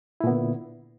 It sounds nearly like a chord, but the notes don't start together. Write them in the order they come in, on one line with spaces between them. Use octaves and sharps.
E4 A#2 B3 D3